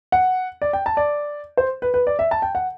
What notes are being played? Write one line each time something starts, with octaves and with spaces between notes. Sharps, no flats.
F#5
D5
G5
A5
D5
C5
B4
B4
D5
E5
A5
G5
F#5